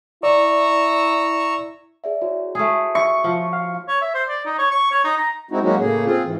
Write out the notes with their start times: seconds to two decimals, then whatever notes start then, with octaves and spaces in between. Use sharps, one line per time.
0.23 E4 D5 A#5 C#6 E6
2.04 G#4 D5 E5
2.22 E4 F#4 C#5
2.55 A3 G#4
2.95 E5 C#6
3.24 F3
3.53 F5
3.88 C#5
4.01 E5
4.15 C5
4.28 D5
4.45 D#4
4.59 C#5
4.71 C#6
4.91 C#5
5.04 D#4
5.17 A#5
5.51 G#3 C4 D#4 E4 F#4
5.62 F#3 G#3 A#3 C#4 D#4 F#4
5.79 A2 C#3 A#3 G#4
6.06 C4 F4 G#4
6.25 G#2 E3